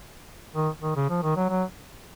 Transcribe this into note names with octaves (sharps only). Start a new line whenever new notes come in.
D#3
D#3
C#3
F3
D#3
F#3
F#3